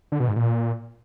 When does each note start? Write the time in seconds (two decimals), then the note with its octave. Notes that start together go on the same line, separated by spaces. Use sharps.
0.12 D3
0.20 B2
0.28 G#2
0.36 A#2